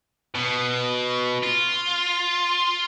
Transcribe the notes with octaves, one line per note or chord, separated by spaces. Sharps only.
B2
F4